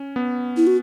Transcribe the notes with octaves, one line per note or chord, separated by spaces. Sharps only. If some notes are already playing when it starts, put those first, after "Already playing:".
Already playing: C#4
B3
E4
F#4